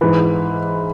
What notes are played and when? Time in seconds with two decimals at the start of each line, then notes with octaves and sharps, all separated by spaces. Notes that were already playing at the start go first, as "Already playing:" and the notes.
0.01 G#2 E3 B4